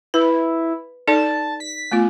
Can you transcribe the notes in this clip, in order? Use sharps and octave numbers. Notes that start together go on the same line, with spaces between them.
E4 B4
D#4 A4 D5 A5
B6
A3 B3 F4